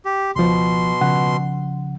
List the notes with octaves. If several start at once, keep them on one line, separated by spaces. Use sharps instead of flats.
G4
C#2 B2 F3 C6
C#3 F3 F#5